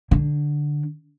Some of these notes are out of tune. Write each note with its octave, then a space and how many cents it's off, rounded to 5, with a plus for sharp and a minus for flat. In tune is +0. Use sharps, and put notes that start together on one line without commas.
D3 +5